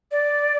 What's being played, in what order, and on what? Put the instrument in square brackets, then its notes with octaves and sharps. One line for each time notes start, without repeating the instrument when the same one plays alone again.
[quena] D5